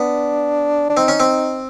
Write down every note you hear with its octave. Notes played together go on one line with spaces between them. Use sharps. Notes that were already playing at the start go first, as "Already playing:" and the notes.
Already playing: B3 D4
D4
C4 D#4
C#4
C4